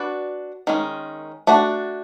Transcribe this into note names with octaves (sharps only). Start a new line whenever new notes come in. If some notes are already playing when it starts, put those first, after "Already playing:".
Already playing: D4 F#4 B4 D5
D#3 G#3 C#4
A3 D4 F#4